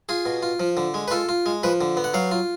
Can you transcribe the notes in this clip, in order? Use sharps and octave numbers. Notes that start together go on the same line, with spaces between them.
F4 G#4
B2
F4
F3
D3
G#3
B4
F4 A4
F4
G#3
F3 B4
D3
B3
F#5
F#3 F5
F4